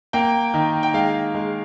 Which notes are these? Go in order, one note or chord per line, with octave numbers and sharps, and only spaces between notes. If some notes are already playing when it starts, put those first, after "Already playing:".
A#3 G5
D#3
G5
G#3 F5
G#3